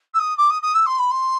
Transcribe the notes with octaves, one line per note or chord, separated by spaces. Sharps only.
E6
D#6
D6
D#6
D#6
E6
C6
B5
C6